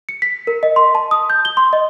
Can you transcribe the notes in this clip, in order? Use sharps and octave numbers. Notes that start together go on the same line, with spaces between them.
C#7
B6
A#4
D#5
C6
A5
D#6
G6
G7
C6
D#5